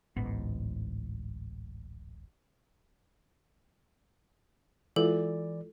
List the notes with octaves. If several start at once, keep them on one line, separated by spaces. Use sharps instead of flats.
D1 A1 G#2 B3
E3 G#3 E4 F4 A4 D5